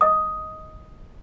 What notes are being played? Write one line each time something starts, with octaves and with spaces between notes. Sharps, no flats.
D#5 D#6